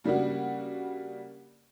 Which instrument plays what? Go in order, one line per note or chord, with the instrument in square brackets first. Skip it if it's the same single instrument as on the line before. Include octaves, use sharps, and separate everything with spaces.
[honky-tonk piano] C#3 G3 A#3 D4 F#4